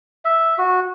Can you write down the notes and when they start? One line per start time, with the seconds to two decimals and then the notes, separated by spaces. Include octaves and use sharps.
0.25 E5
0.58 F#4